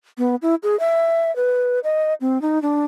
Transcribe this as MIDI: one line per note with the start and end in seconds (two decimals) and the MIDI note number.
0.18 0.35 59
0.42 0.55 64
0.63 0.78 68
0.80 1.34 76
1.36 1.80 71
1.84 2.14 75
2.21 2.41 60
2.42 2.61 63
2.62 2.85 62